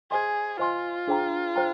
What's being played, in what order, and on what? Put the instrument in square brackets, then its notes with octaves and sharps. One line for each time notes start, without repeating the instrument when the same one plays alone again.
[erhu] G#4 [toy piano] C5 D#5 G#5 C6
[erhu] F4 [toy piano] C5 D#5 G#5 C6
[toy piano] D4 G#4 C5 G5 A#5
C5 G5 A#5